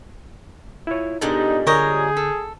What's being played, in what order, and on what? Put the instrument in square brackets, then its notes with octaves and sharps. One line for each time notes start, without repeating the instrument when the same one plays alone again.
[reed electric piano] E4 F4 C#5
[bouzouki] A#2 G3 G#3 [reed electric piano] B3 D4 A4 [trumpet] D#4
[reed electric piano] D3 G#5 G6 [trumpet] G#4 [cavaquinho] A#4 C#5 D#5
[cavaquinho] A4